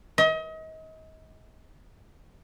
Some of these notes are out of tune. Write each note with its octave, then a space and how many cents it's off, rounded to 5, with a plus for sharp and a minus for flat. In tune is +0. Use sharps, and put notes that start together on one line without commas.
D#5 +35